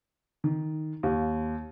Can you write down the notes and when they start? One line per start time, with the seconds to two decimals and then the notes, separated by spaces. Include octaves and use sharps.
0.44 D#3
1.03 D#2